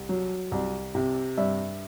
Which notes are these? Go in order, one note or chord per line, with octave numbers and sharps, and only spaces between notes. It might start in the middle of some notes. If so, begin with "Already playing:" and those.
Already playing: C2
F#3
C2
C3
G2 E5